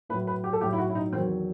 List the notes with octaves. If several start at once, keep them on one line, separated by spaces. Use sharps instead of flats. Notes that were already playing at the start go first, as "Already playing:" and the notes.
A2 F#3 B4
B4
G4
A4
A2 F#3 G4
E4
F#4
E4
D#4
E2 D#3 F#3 C4